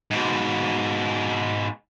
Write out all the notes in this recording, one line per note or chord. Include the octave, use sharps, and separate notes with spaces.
G#2 B2